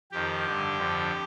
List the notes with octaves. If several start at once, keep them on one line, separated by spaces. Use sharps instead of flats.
F2 D#3 G4
G2 D3
F2 D3